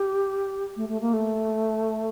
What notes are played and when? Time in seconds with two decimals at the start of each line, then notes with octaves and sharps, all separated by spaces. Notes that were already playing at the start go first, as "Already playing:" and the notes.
Already playing: G4
0.77 A3
0.89 A3
1.01 A#3
1.13 A3